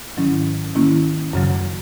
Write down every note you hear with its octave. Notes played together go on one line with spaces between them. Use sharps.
G#2 D#3 F#3 C#4 E4
D#3 A#3 C#4 E4
F#2 C#3 F#3